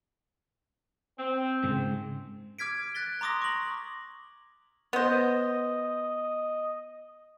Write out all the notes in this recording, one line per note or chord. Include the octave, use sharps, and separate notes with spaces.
C4
G#2 C#3
D6 F6 G#6 B6 D7
F#6 A6 B6 G7
A#5 C6 D6 D#6 A#6
C#6 F#7
B3 C5 D#5